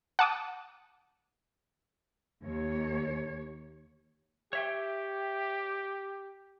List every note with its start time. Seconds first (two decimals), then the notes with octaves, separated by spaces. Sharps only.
0.19 F#5 A5 D6 D#6
2.43 D#2 C#5
4.53 G4 C#5 E5 G5